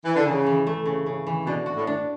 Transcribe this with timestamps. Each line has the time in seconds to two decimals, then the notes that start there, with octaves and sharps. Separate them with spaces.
0.05 E3
0.16 D3
0.25 C#3 E3
0.46 E3
0.67 A3
0.86 C#3
1.06 C#3
1.27 E3
1.46 B2 D4
1.66 F#4
1.76 A2
1.87 D4